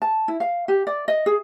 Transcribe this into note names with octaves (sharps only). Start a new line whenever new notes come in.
A5
E4
F5
G4
D5
D#5
G#4